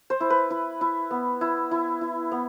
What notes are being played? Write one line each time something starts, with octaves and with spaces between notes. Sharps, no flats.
C5
E4
B4
E4
E4
B3
E4
E4
E4
B3